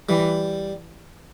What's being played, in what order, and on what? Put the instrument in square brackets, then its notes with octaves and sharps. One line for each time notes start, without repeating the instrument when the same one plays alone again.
[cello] E3 [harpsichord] G3